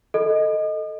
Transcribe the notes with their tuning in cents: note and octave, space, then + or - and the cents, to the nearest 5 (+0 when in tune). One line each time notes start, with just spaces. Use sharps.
A4 +0 D#5 +0